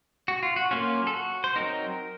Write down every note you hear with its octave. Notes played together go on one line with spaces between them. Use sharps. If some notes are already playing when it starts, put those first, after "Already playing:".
F#4
F4
F#4
F#3 A#3 C#4 F4
A4
F#4
C5
F#3 C4 D#4 A#4